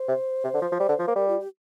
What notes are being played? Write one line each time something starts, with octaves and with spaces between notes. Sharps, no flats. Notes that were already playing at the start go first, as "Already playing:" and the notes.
Already playing: C5
C3
C3
D3
F3
F3
G3
D3
F3
A#3
G3 A#4
F4
G4